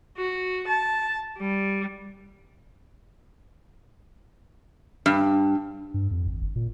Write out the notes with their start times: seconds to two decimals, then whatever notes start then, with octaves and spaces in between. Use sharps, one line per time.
0.18 F#4
0.68 A5
1.38 G3
5.06 G2
5.94 G2
6.11 F2
6.27 G#1
6.42 G1
6.56 A#2